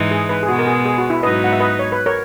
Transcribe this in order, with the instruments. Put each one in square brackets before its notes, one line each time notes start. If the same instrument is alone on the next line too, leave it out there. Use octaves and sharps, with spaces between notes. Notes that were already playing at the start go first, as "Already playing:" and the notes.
Already playing: [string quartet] G#2 E3 G#3 D#4
[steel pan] G#4
B4
G#4
[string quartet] B2 G#3 B3 [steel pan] F#4
[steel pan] A#4
G#4
G#4
F#4
E4
[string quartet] G#2 F#3 B3 D#4 [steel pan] B4 D#5
[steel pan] F#5
E5
B4 D#5
C#5
B4
A#4 C#5